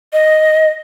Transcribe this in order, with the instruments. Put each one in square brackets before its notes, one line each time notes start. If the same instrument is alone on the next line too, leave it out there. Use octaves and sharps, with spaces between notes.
[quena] D#5